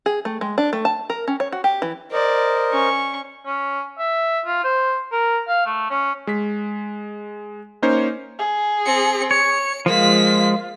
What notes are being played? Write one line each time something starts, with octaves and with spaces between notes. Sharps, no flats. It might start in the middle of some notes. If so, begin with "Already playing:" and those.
G#4
A3
G#3
D4
A3
A5
A#4
C#4
C#5
F#4
G4
E3
A#4 C5 D5 D#5
C#4 C#6
C#4
E5
F4
C5
A#4
F5
A3
C#4
G#3 B6
A#3 C#4 D#4 C5 C#5
G#4
C4 C#7
C#5 C#7
F3 G#3 A#3 F4 B6